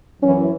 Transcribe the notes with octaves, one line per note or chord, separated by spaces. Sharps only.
F#2 E3 C#4